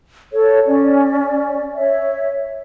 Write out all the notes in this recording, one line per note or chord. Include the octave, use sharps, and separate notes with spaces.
A4 C#5
C#4 D5
C#5 E5